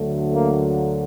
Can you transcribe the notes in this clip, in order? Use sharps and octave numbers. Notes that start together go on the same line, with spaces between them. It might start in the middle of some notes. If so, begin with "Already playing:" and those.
Already playing: D2 D3 F#3 A3
A#3